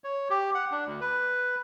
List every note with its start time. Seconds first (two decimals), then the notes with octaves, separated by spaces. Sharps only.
0.04 C#5
0.30 G4
0.55 F#5
0.72 D4
0.86 D2
1.01 B4